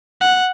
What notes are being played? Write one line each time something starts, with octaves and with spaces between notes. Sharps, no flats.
F#5